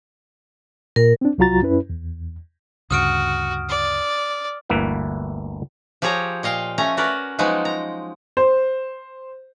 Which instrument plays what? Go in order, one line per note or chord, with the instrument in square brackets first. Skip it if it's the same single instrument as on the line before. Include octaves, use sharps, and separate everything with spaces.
[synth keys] A#2 [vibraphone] A#4
[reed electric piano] C4 D4
C2 F#3 F4 F#4 A#5 A6
F#2 C#4 E4 B4
E2
[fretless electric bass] D2 G2 C#3 [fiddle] F#4 [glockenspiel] D#6 F6 D7
[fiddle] D5
[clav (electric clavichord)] G1 D2 E3 A#3 E4 B4
[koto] F3 G4 G#4 C#5 A#5
A#2 D#5 F5 G5
A3 C#4 G#5 A#5
C#4 F#4 A#4 B4 D5
F3 F#3 G#3 B3 D#4
A#5
[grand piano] C5